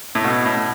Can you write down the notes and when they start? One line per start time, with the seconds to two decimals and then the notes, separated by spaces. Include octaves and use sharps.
0.15 A2
0.24 B2
0.46 A2